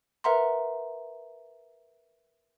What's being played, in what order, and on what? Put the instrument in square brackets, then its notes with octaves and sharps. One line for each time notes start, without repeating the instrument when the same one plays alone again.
[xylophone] A#4 B4 E5 F#5 A#5 C6